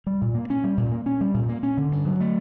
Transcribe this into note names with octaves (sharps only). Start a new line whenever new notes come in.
G3
A#2
A#3
C#4
G3
A#2
A#3
C#4
G3
A#2
A#3
C#4
D3
G2
F#3
A3